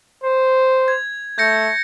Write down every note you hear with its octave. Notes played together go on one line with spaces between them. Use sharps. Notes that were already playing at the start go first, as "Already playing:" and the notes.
C5
G#6
A3 G6 A#6 C#7